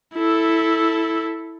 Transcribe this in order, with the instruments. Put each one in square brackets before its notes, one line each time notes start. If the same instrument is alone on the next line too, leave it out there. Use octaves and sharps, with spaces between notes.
[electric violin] E4 A4